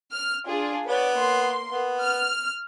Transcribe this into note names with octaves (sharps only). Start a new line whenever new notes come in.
F6
D4 F4 G#4
B3 B4 C#5 D5
A#3 C6
B3
F6